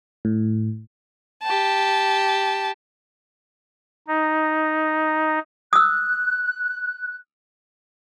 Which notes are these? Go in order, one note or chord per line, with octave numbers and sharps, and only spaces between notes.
A2
G4 A5
D#4
D#6 E6 F#6